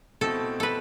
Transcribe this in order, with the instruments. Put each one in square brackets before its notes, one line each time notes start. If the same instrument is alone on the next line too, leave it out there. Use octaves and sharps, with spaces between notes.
[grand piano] B2 A3 C4 E4 [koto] A4
[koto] A4 B4